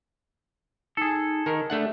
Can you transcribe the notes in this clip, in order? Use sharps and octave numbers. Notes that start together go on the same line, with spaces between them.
D#4 G#4 A4
D#3 A#4
A3 D4 E5 F#5